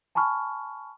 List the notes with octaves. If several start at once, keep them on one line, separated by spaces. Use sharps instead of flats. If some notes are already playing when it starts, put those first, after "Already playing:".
G#5 A5 B5 C#6 F6